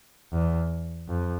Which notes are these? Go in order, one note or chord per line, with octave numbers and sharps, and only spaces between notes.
E2
F2